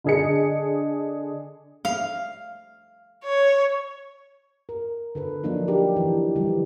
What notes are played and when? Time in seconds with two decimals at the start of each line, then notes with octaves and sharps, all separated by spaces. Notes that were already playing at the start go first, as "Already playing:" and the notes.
0.04 D3 D4 G#4 D#5 C#7
1.85 F5
3.24 C#5
4.69 A#4
5.15 D3 A4 B4
5.44 F3 F#3 A#3 D4 D#4
5.68 D4 G4 A#4
5.96 E3
6.36 D3 E3 F3 G3